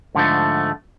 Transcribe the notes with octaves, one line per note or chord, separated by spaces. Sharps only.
G#2 D3 F3 A3